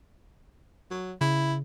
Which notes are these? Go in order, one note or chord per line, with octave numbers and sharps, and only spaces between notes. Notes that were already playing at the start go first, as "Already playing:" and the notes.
F#3
C#3 E4